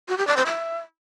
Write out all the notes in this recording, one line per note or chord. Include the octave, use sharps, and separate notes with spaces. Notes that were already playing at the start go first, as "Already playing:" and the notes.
F#4
G4
D5
C5
E5